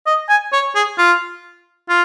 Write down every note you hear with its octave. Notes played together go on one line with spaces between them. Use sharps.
D#5
G#5
C#5
G#4
F4
F4